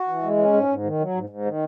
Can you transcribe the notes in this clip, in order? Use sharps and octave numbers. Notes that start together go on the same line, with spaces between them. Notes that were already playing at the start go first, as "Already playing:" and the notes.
Already playing: F#4
E3
G#3
C#4
G#2
G#2
D#3
F#3
G#2
G#2
D#3